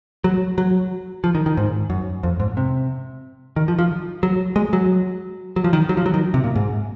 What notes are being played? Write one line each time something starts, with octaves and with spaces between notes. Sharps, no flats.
F#3
F#3
F3
D#3
D#3
G#2
F#2
F2
G#2
C3
D#3
F3
F3
F#3
G#3
F#3
F#3
F3
D#3
F#3
F3
F#3
D#3
C3
A#2
G#2